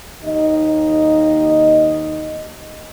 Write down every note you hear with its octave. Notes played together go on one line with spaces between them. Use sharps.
D#2 D#4 D#5